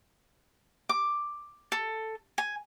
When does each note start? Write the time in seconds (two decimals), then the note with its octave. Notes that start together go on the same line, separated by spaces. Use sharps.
0.89 D6
1.72 A4
2.38 G#5